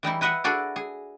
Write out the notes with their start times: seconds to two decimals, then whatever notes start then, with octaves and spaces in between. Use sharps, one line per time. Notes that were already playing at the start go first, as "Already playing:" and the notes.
0.03 E3 G3 D#4 E4
0.21 E4 B4 D#5 E5 F#5
0.44 D4 E4 F#4 G#4 A4 D5
0.76 G#4